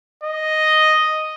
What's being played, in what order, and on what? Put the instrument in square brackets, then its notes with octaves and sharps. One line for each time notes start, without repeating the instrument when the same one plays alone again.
[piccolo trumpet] D#5